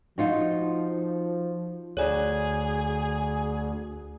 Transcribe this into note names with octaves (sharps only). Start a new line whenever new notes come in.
F3 D#4 F4 F#4
D2 G#4 C#5 D5